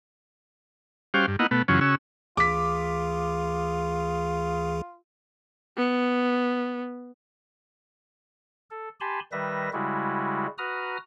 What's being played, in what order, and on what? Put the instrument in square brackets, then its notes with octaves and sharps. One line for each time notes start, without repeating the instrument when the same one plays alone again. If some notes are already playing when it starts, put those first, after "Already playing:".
[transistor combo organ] G3 C#4 F#4 G4 C5 F5
G2
A#3 B3 E4 F4 D#5 F#5
B2 A3 B3
F#2 C#3 E3 F#3 C#4 F4
C#3 C#4 F#4 E6
[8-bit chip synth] D2 E3 G#4 [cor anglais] F4 [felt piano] D6 B6
[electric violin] B3
[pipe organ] A4
G4 G#5 A5 B5 C6
D#3 G3 B4 E5 A#6
C#3 G3 G#3 E4 F#4
F#4 B4 A#5 D#6 F6